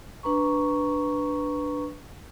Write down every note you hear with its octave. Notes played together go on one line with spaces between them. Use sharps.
D4 B4 A#5 C#6